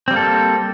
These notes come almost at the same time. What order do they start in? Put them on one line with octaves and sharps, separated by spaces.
C4 G3 A#3 A4